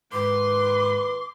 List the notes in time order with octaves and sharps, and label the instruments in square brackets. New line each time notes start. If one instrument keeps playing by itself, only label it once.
[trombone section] D#2 B4 [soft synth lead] G#2 [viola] C6 [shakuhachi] D6